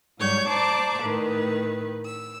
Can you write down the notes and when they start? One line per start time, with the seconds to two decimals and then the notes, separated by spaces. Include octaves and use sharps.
0.19 G#2 F#3 G3 C#5 G6
0.48 C5 D5 A5 A#5 C#6 D6
1.03 A2 D#3 B4
2.05 E6